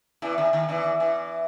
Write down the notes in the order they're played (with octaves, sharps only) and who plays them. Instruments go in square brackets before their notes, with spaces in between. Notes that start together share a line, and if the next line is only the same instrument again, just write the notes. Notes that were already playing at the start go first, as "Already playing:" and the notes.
[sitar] E2 E3
D#2 D#3
D#2 D#3
E2 E3
E2 E3